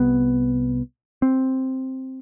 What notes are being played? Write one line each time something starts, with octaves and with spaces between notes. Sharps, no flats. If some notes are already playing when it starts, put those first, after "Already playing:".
Already playing: C2 C3 B3
C4